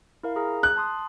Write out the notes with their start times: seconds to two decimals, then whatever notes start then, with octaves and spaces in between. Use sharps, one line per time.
0.23 E4 A#4 F5
0.36 G#4 A#5
0.63 F#6
0.76 A5 C6 D#6